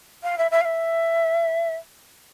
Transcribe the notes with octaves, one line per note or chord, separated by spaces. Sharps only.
F5
E5
E5
F5
E5